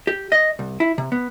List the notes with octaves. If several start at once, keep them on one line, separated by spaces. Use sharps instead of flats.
G4
D#5
C2
E4
C3
B3